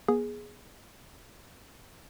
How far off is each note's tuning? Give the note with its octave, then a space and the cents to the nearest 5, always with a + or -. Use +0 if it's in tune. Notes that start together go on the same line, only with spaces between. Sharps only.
B3 -45 G#4 +0